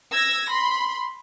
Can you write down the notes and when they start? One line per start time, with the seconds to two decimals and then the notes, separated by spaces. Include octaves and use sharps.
0.13 E6 G#6 A#6
0.52 B5 C6